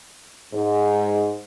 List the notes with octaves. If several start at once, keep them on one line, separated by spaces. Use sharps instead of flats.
G#2